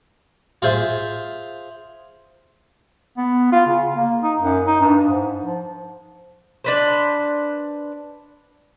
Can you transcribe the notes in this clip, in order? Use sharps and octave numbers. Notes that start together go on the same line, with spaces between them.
F4 G#4 C5 E5
B3
F4
C#3
A#3
D#4
F#2
D#4
G2
G#2
F3
D4 B4 C5